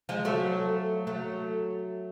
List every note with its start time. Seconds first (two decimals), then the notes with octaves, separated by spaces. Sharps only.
0.09 F3 G#3
0.25 F#3 A3
1.07 F#3 A3